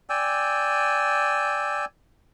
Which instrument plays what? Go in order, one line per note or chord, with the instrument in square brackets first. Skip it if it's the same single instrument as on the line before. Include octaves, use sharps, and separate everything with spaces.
[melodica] D5 G5 G#5 E6